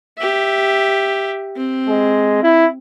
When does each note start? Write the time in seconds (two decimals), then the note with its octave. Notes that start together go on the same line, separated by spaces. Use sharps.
0.18 G4 E5
1.56 C4
1.88 G#3
2.43 E4